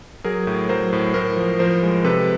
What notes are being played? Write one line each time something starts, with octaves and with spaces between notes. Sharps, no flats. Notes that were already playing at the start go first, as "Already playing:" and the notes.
F#3 G#4 A#4
A2
F#3 A#4 C5
A2
A2 A#4 C5
F3
F3 A#4 C5
G#3
C3 A4 B4